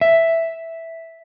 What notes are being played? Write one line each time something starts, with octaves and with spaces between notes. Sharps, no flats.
E5